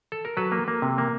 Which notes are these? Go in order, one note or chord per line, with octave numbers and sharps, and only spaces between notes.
A4
A#4
F#3 A4 B4
A#3
A#3
C3
A#3